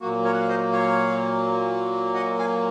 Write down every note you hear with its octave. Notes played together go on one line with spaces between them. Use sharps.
A#2 F#3 A#3 F#4
A#4 C#5
F#5
F5
C5 D#5
C#5 F5
D#5 F#5
F5 G#5